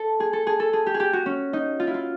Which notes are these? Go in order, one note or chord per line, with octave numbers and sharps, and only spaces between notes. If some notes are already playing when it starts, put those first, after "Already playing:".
Already playing: A4
G#4
A4
G#4
A4
G#4
G4
G#4
G4
F#4
C#4
D#4
F4
E4
F4